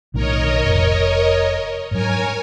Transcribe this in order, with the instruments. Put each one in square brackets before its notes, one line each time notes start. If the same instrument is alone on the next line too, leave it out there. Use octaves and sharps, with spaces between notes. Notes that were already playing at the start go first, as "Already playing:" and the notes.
[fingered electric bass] B1 A2 D#3 [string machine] A#4 C#5 D#5
[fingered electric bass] F1
[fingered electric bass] G#2 F#3 [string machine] A#4 C#5 G#5